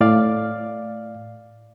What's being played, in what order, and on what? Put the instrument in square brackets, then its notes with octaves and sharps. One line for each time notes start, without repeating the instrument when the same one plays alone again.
[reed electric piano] A2 D5 F5